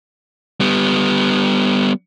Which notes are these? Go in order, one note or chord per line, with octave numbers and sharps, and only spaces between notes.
G3 B3